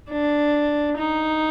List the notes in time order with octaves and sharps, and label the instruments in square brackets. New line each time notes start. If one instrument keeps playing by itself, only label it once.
[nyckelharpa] D4
D#4